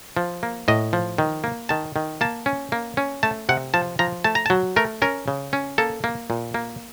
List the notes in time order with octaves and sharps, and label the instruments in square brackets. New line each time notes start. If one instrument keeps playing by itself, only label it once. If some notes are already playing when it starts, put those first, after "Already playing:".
[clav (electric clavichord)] F3
A#3
A2 D#5
F3
D#3
A#3
D#3 A5
D#3
A#3 A5
C#4
A#3
C#4
A3 A5
C3 F#5
F3 A5
F3 A#5
A3 A5
A#5
A5
F#3
A3 A#4
C#4 A#4
C#3
C#4
A#3 A4
A#3
A#2
A#3